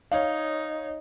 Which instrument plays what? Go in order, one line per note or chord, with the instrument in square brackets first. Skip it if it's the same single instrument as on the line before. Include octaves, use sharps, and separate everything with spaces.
[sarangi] D#4 [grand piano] C#5 F5